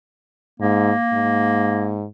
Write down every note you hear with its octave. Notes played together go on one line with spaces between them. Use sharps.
G#2 A#3
G#2